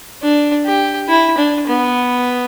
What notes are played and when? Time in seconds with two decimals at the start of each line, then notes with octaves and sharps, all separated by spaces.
0.22 D4
0.66 G4
1.09 E4
1.38 D4
1.67 B3